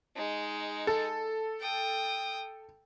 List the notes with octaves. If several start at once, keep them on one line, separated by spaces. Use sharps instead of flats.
G#3 D#4
A4
G5 D#6